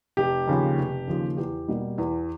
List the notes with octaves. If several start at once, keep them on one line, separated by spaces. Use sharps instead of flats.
F1 G4
D#2 C#3 F3
F1
D#2 C#3 F3
E2 G4
B2 G3 A#3
E2